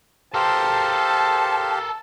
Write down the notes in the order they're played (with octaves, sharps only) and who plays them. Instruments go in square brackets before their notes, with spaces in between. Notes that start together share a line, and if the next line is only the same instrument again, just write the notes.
[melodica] G4 F5 [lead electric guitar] A4 A#4 [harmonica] C5 [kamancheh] A5